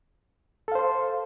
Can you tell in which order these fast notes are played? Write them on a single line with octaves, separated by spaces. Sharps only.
A4 F5 C5 C6